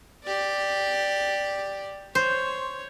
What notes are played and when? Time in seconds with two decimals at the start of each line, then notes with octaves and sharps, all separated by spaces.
0.24 G4 D5
2.15 C5 C#5